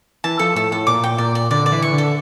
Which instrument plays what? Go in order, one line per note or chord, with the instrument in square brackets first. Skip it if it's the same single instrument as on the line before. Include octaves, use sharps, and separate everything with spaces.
[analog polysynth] E3 [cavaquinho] A5
[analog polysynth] F3 [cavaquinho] A4
[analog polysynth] A2 [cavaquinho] A4
[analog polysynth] A2 [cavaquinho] A4
[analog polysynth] A#2 [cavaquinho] D6
[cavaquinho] G5
[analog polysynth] A#2 [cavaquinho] D5
[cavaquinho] D5
[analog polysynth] D3 [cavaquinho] D5
[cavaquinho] D5
[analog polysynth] E3
[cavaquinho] C#6
[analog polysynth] D3
[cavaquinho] A4